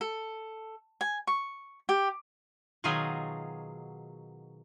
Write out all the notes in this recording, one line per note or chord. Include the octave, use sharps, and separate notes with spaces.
A4
G#5
C#6
G4
B2 D#3 F#3 F4 G#4 G#5